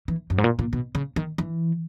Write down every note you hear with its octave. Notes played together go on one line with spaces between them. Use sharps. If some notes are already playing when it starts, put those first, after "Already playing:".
E3
F#2
G#2
A#2
A#2
B2
C#3
D#3
E3